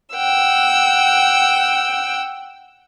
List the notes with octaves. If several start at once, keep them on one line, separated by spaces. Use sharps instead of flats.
F#5 G5 E6